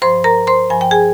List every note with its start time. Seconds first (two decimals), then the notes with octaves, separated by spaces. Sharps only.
0.02 G2 F3 C5 C6
0.24 A#4 A#5
0.47 C5 C6
0.70 G2 F3 G#5
0.81 G5
0.91 G#4 G#5